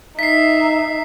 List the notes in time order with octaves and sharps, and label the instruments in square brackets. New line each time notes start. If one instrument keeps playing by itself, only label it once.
[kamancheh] D#4 E5 [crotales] B6 C7